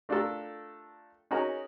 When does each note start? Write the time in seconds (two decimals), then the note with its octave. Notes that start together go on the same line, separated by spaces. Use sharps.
0.09 A3 D4 F4 G4 A4 A#4
1.31 C#4 D#4 F#4 G#4 A#4